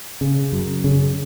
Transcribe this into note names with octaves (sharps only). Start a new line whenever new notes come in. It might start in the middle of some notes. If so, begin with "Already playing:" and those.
C#3
F#2
C#3